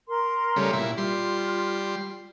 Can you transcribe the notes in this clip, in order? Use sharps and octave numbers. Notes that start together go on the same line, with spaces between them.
A#4 A#5 C6
C#3 G3 A3
A#2 E4
G3 F4 C6